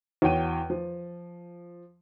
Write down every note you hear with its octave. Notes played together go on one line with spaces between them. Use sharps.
E2 F#4 C#5 G5 D#7
F3